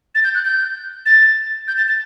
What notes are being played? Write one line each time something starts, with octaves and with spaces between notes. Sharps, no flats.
A6
G6
F#6
G6
A6
G6
A6
A6